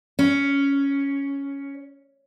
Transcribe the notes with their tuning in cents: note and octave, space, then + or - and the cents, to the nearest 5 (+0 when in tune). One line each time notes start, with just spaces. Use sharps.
C#4 +5